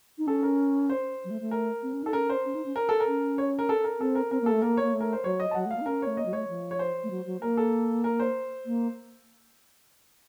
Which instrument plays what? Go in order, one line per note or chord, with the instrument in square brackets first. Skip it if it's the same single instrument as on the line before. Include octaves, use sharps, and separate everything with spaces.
[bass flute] D#4
[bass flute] C#4 [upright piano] A4
[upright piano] A#4
C5
[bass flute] F#3
A3
A3
[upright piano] A#4
[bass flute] C4
C#4
D#4
[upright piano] A4
[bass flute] C#4 [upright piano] A#4
[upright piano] C5
[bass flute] C#4
D#4
C#4
[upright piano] A#4
A4
A#4
[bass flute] C#4
[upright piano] C#5
A#4
A4
A#4
[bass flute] C4 [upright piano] A4
[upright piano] A#4
[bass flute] C4 [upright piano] A#4
[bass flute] A#3
[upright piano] A4
[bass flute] A3
[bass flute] A#3 [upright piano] A#4
[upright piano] C#5
[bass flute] A#3
A3
[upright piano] A#4
C5
[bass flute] F#3 [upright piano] C#5
[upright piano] D#5
A5
[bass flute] F#3 [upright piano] F#5
[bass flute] A3
[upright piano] F5
[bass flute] A#3
D#4
[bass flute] C#4 [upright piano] A#4
[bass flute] A3 [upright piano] C#5
[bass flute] A#3 [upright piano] D#5
[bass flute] F#3
[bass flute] A3 [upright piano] C#5
[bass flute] F3
[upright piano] C#5
C5
[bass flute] A3
F#3
F#3
[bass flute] A#3 [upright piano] A#4
[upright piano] A4
A#4
C5
[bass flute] A#3